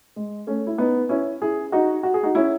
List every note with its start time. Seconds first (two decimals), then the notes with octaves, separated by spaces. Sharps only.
0.16 G#3
0.47 A3 C#4
0.67 E4
0.78 B3 D#4
1.09 C#4 E4
1.42 E4 G#4
1.72 D#4 F#4
2.03 F#4
2.14 G#4
2.23 D#4 F#4
2.35 C#4 E4